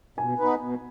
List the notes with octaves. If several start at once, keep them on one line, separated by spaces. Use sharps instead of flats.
B2 G#5
B3 D#4 B4
B2